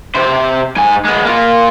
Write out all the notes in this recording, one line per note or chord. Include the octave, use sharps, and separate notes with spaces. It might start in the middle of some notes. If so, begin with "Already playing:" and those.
C3 C5
G#2 G#5
G#3 B3
A#3 F4